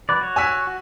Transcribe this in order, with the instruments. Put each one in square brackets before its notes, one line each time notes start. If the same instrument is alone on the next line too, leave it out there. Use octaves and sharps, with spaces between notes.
[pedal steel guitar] F#3 B4 D5
F#4 C#5
[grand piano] G#5 E6 B6
[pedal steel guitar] F#4